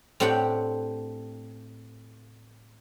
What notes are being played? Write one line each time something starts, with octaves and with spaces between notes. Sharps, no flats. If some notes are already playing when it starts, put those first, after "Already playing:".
A2 C4 D4 G4 F#5 G5